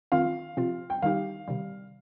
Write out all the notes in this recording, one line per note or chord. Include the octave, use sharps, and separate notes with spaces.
D#3 C4 F4 F5
C3 F3 C4 F4
G5
D#3 G3 D#4 G4 F5
C3 D#3 G3